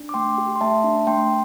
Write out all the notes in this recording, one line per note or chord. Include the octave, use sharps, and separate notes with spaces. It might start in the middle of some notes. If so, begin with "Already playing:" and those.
Already playing: D4
D6
A3 G5 C6
G4
C6
A3 E5 A5
D4
A3 G5 C6